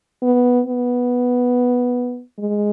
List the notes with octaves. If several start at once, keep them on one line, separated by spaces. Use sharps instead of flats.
B3
B3
G#3